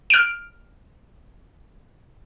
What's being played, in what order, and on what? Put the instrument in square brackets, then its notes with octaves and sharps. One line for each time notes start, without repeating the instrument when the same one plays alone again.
[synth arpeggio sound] F6 D7